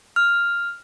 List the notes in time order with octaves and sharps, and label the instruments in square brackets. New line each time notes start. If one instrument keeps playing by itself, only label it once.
[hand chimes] F6